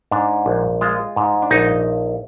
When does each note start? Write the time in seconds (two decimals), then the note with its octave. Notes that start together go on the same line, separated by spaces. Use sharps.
0.11 G#2 D4
0.46 A#1
0.81 G#3 F4
1.16 G#2
1.42 D4
1.51 A#1 D#4